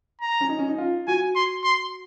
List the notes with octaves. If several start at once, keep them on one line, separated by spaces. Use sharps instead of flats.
A#5
C#4
D#4
C#4
D#4
F4
F#4 G#5
C6
C6